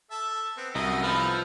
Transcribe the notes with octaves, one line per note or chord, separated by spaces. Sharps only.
A4 E5 A5
B3 C4
C2 F#2 D#5 E6
F3 D#4 E4 A4 B4 F6